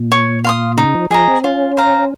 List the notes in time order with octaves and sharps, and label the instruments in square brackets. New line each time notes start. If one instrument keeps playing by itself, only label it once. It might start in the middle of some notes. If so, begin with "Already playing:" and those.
Already playing: [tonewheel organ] A#2
[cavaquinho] C#5
F5 C6 D#6
[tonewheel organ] C#3 [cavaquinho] D#4
[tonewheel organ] F3
[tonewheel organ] F3 [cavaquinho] G#4 D#5 A#5
[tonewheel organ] C4
[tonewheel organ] C#4 [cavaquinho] F4
[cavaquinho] C5 F5 A#5